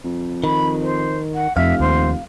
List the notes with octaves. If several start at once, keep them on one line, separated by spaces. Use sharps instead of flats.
F2
D#3 B5
C5
F#5
F1 F2 E5 F5
D#2 C5